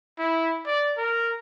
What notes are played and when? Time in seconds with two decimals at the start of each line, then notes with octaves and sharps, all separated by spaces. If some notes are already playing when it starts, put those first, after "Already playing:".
0.19 E4
0.66 D5
0.97 A#4